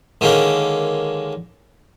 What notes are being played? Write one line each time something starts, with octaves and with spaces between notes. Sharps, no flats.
D3 D#3 G#3 A#3 C#4